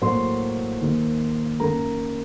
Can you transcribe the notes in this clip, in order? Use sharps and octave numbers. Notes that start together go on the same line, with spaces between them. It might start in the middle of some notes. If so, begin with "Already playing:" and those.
A2 F#3 A#3 C5 C6
D#2 D#3 A#3 D#4
F#2 D#3 A#3 A#4 A#5